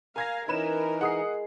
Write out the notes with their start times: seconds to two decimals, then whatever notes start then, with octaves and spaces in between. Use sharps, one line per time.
0.16 A#4 F5 G#5 G#6 A#6
0.48 E3 C#4 D#4 E4 A#4 B4 E7
1.01 G#3 G#4 F#5 D#6 C7